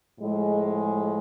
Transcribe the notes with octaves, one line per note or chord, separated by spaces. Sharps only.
A2 F3 G#3